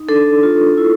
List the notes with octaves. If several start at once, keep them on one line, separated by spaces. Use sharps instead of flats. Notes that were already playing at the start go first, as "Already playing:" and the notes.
Already playing: D#4
D4 A4
F4
E4